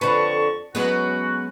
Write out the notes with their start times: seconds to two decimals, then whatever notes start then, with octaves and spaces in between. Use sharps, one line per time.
0.01 F2 D3 B4 A5 C#6
0.75 F#3 G#3 B3 C#4 F#4